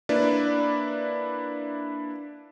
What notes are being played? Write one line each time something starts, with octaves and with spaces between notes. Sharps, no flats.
A#3 D4 E4 B4 D5